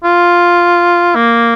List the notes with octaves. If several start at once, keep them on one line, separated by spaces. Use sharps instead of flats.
F4
A#3